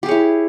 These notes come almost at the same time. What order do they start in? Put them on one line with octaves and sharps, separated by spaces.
G4 G#4 C#5 E4